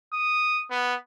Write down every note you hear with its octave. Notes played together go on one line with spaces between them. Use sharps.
D#6
B3